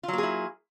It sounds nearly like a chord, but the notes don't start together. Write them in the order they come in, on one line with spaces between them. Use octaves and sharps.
F4 F#3 A#3 G#4 E4